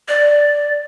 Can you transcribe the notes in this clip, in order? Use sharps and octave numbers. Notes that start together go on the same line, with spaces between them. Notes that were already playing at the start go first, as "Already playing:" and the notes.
D5